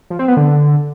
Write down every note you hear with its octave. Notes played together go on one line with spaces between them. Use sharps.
F3
C4
B3
D3